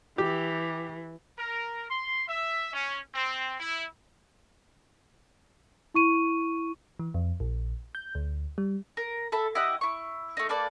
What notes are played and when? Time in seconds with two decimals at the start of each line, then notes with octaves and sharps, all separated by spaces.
0.18 E3 G4
1.38 A#4
1.89 C6
2.27 E5
2.73 C#4
3.14 C4
3.59 E4
5.94 E4 C#6 D#7
6.99 E3
7.14 F2
7.40 A#1
7.95 G6
8.15 D2
8.58 G3
8.97 A#4
9.32 A4 E5 B5
9.55 E4 G4 D#5 F#5
9.81 E4 C#6
10.37 A3 D#4
10.49 A#3 A4 B4 D5